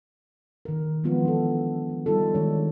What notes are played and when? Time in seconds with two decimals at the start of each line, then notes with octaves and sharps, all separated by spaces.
0.65 D#3 A#4
1.04 E3 F3 G#3 B3 F4
1.25 D4 A4
1.89 F3
2.06 G3 D#4 F4 A4
2.34 D#3 G#3 D4 C#5